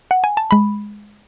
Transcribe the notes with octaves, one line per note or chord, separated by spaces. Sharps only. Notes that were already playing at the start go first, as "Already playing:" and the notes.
F#5
G#5
A5
G#3 B5